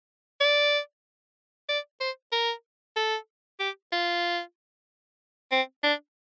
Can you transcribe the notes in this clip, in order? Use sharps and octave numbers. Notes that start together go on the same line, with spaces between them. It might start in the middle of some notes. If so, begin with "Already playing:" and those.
D5
D5
C5
A#4
A4
G4
F4
C4
D4